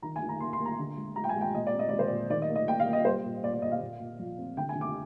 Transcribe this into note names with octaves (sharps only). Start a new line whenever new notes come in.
D#3 A#5
G#5
D#3
A#5
A#3 C6
C6
A#3
A#5
D3
G#3
G#3 A#5
G5
G#5
G#3
G5
A#2 D#5
D5
C4
D#5
G#3 D5
C5
D5
A#2
D#3 D5
D#5
A#3
D#5
A#3 G5
F5
A#3
D#5
G3 C5
A#2
A#2 D5
D5
A#2 D#5
F5
A#2
A#2
F3
C4
D3 G5
G#5
D3
D6